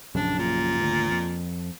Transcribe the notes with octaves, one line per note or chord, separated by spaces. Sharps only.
A#1 F#2 C#3 D4
A#2
G#1 D2
F2